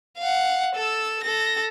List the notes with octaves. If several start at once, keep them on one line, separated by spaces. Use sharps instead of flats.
F5 F#5
A4 E6
A4 A#6